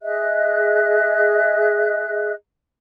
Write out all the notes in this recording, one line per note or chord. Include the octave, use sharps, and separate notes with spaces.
G#4 D#5 E5 F#6